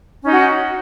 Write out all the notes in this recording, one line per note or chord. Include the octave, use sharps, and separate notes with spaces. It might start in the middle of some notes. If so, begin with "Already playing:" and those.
C#4 D#4 F#4